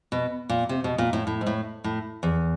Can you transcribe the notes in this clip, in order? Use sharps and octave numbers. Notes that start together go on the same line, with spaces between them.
B2
A#2
C3
B2
A#2
A2
A2
G#2
A2
A2
E2